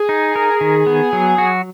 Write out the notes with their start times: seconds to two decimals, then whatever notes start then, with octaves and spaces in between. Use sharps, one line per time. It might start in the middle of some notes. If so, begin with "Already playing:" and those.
Already playing: G#4
0.09 D#4
0.36 A#4
0.61 D#3
0.87 B3
1.13 F#3
1.38 F#4